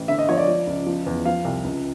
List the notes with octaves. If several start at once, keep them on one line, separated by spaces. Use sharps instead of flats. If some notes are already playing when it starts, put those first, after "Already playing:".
Already playing: A1
D3 E5
D#5
F3 C#5
D5
F3
C#2
F3
E2
F3 F5
C2
C#2